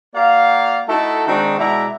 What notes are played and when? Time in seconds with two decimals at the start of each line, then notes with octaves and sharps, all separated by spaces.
0.15 A#3 F#4 D5 F5
0.88 A3 D#4 E4 F#4 A4
1.28 D#3 G#3 C4 D4 D#4 F#4
1.59 B2 G#3 E4 D5 E5 A#5